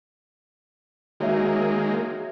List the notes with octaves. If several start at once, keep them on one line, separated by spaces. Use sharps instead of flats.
D#3 G#3 A#3 F#4 C#5 E5